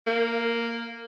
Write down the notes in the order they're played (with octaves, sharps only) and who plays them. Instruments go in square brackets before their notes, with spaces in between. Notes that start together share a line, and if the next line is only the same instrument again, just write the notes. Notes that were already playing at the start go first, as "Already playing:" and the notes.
[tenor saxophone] A#3